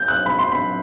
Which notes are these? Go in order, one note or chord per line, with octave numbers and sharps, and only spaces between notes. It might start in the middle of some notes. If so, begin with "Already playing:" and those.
Already playing: G6
F#6
B5
C6
B5